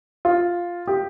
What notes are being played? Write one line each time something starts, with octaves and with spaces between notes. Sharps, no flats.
F4
G4